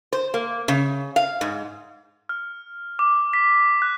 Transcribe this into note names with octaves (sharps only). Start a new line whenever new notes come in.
C5
A#3
C#3
F5
G#2
F6
D6
B6
F#6